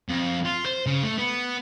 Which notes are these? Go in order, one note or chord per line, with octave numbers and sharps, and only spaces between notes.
F2
F4
C5
C#3
A3
B3